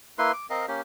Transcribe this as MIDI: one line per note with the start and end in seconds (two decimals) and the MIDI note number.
0.18 0.32 58
0.18 0.32 64
0.18 0.32 71
0.18 0.32 84
0.33 0.46 86
0.50 0.66 60
0.50 0.66 70
0.50 0.66 75
0.50 0.66 77
0.68 0.81 58
0.68 0.81 61
0.68 0.81 67